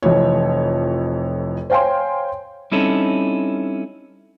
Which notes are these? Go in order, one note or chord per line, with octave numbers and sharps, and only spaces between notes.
F1 F2 E3 C#5
C5 C#5 F5 G5 G#5 C6
G3 C4 C#4 D#4 E4 A4